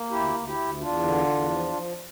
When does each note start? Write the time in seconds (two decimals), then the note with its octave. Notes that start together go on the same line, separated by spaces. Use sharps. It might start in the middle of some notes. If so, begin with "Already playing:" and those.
Already playing: A#3
0.11 D2 E4 G4
0.35 D2
0.46 E4 G4
0.58 D2
0.81 E2 D4 F4
1.03 D3
1.27 E2
1.50 F3
1.73 F3